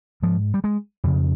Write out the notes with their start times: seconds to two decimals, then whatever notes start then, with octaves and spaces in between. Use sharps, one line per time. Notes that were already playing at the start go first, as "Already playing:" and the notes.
0.22 G#2 F3
0.54 G3
0.64 G#3
1.04 F2 C#3